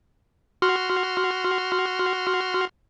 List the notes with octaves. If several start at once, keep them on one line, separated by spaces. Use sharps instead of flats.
F#4 C6 F6